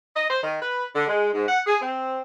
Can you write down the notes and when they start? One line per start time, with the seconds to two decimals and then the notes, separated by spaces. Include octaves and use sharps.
0.16 D#5
0.30 C5
0.43 D#3
0.62 B4
0.96 D3
1.08 G#3
1.33 G#2
1.48 F#5
1.67 G#4
1.82 C4